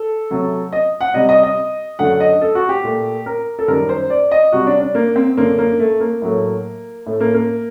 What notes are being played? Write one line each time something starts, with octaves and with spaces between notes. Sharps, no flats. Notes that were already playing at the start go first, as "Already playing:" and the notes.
Already playing: A4
C3 F#3 A3
D#5
F#5
C3 G3 D#5
D#5
D#5
F#2 D3 F#3 A3 F#5
D#5
A4
F#4
G4
A#2 A3
A#4
A4
F#2 D#3 G3 A#4
C5
D5
D#5
C3 G3 F#4
D4
D4
A#3
C4
F#2 D3 A3 A#3
A#3
A3
A#3
A2 F#3 A3
A2 A3
A#3
A#3